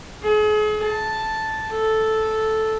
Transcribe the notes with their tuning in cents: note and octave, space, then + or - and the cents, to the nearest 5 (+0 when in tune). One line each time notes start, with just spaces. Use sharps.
G#4 +40
A5 +0
A4 -5